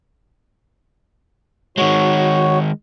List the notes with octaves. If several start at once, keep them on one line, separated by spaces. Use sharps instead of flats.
D#3 G#3 F#4 C#5